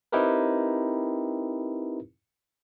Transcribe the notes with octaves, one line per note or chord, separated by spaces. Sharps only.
C4 D#4 E4 G4 A#4 B4